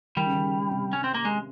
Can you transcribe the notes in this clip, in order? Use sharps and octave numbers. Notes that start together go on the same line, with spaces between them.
D#3 G3
C#3
D#3
C#3
C3
C#4
C4
A#3
G#3